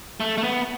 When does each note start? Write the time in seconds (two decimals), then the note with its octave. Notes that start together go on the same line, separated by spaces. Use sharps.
0.20 A3
0.38 A3
0.44 B3